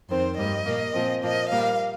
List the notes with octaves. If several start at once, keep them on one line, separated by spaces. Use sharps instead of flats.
F2 D#3 C4 C5
G2 G3 A#3 D#5
A#2 A#3
A#2 F3 C4
A#2 F3 A#3 D#5
A#2 G3 A#3 F5